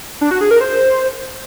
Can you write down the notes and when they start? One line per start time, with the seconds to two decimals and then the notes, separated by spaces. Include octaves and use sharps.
0.21 D4
0.31 F#4
0.41 G#4
0.51 A#4
0.61 C5